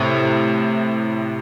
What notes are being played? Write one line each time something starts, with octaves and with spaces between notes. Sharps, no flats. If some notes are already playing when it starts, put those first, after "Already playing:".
Already playing: A2 C3